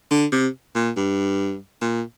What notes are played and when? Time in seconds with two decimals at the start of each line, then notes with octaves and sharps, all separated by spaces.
0.11 D3
0.32 C3
0.75 A#2
0.97 G2
1.81 A#2